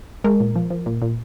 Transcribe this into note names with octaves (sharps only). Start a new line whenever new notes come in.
G#3 A#4
A#2
F3
F3
A#2
A#2